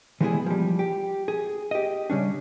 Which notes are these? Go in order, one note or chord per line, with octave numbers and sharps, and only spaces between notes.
E3 G3 G#3 B3 E4 G#4
F3 G3
G4
G#4
G4 D#5
C#3 G3 C#4 D4